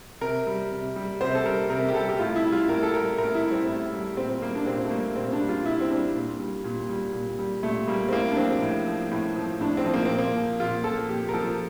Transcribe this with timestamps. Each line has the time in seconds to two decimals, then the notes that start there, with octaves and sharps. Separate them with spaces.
0.21 C3 A#4
0.47 G3
0.71 C3
0.96 G3
1.21 C3 C5
1.35 A4
1.45 G3 A#4
1.70 C3 A#4
1.89 G4
1.95 G3 A4
2.09 G4
2.19 A2 F4
2.36 E4
2.44 G3
2.52 F4
2.69 A2 A#4
2.83 A4
2.94 G3 A#4
3.18 A2 A#4
3.35 E4
3.43 G3
3.51 C4
3.68 A2
3.93 G3
4.17 A#2 C4
4.42 G3 A#3
4.55 D4
4.66 A#2 C4
4.85 A3
4.91 G3 A#3
5.16 A#2 C4
5.32 D4
5.41 G3
5.49 F4
5.65 A#2 E4
5.81 C4
5.90 G3 D4
6.15 A#2
6.39 G3
6.64 A#2
6.89 G3
7.13 A#2
7.39 G3
7.63 A#2 A3
7.87 G3 A#3
8.09 C4
8.13 A2 A#3
8.32 D4
8.37 F3 C4
8.62 A2
8.86 F3
9.11 A2
9.36 F3
9.61 A2 D4
9.77 C4
9.86 F3
9.94 A#3
10.05 A#2 C4
10.18 A#3
10.35 F3
10.60 A#2 F4
10.84 F3 A4
11.09 A#2 G4
11.29 A#4
11.33 F3 A4